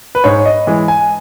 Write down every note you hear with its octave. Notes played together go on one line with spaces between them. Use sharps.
B4
G#2 C#5
D#5
E3 G#3
G#5